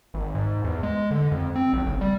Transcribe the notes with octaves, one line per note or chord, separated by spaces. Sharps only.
G#1
G#2
E2
G#3
D3
F2
C4
B1
F#1
G3